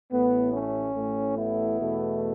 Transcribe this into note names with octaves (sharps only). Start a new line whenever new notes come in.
A1 A2 A3 B3
A3 C#4
A1 A2 A3
B3 E4
E2 B2 A3